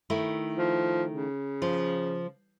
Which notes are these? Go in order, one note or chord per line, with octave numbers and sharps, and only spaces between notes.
D#3 A3 E4
F3
C#3
F3